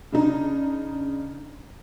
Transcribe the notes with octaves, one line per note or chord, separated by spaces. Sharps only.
C#3 D4 D#4